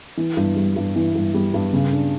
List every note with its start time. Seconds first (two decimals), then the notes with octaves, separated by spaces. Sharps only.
0.17 E3
0.37 G2
0.56 G3
0.76 G2
0.96 E3
1.15 G2
1.34 G3
1.54 G2
1.73 C#3
1.92 D4